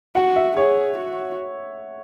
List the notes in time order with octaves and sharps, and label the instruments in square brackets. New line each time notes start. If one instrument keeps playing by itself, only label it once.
[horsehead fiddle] F#4 [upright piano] F#5
[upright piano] E5
[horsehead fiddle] G#4 [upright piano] C#5
[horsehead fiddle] F#4